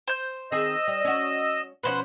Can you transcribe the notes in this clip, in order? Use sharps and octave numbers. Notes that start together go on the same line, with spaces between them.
C5 G6
D#3 C4 G#4 D#5 E6
G3
C#4 F#4
B2 F3 C#4 B4 C5 F#5